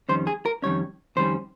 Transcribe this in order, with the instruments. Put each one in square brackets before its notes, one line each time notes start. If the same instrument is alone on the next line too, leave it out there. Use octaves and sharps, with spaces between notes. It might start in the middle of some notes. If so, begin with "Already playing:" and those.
[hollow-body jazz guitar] F2 D#3 G3 C#4 C5
G#4
A#4
F2 D#3 G3 C#4 C#5
F2 D#3 G3 C#4 C5